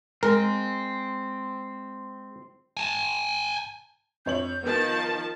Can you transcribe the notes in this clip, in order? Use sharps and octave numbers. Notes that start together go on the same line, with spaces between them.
G#3 C4 A#4
G#5 A5
F2 C#5 G6 F#7
D#3 F3 B3 A5